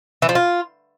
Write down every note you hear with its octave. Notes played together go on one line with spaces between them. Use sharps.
E3
F3
F4